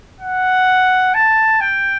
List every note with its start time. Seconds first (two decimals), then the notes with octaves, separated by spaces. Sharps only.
0.20 F#5
1.14 A5
1.61 G5